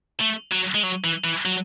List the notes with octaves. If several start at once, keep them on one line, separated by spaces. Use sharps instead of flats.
A3
F#3
G#3
F#3
E3
E3
F#3